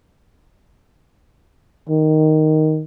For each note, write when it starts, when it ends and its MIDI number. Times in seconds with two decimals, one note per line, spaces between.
1.89 2.84 51